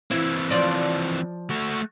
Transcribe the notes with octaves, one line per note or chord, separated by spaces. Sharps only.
E3 C4 E4
F3 D5
A3 F#4